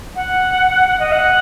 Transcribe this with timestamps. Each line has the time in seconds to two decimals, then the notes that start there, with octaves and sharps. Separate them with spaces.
0.16 F#5
1.00 D#5
1.12 F#5